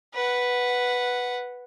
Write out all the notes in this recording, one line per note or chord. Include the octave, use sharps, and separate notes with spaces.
B4 F#5